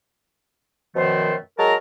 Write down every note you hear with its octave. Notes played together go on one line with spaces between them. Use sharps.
F#2 B2 D#3 F3 A3 C5
F#3 G#3 A#4 A5 A#5